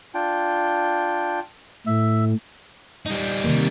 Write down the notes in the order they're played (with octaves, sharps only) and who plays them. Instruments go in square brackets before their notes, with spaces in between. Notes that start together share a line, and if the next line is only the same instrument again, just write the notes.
[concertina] D4 F4 G5
[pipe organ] A2 [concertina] E5
[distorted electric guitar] G3 D#4
[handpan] C3 D#3 A#3